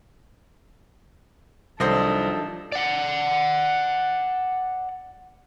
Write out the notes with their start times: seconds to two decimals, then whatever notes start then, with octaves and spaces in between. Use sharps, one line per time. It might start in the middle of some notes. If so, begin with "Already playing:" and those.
1.80 C2 D#3 F3 F#3 D4 A4 C5 D#5
2.72 D5 F#5